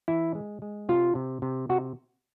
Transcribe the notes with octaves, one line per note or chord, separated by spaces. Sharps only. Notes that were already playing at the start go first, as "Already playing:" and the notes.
E3 E4
G#3
G#3
C3 F4
C3
C3
C3 F#4